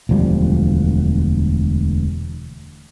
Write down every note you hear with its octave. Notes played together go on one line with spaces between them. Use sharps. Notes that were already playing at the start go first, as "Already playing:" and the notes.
E1 D2 F3 G3